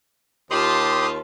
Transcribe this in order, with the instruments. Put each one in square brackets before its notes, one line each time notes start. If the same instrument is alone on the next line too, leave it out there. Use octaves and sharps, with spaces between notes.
[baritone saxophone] D#2 [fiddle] F4 A5 [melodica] G4 C6 D#6